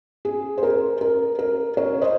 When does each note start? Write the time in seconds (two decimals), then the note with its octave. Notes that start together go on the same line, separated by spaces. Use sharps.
0.25 G#4
0.58 C5
0.63 A#4
1.01 A#4
1.39 A#4
1.77 A#4 C#5
2.01 C5 D#5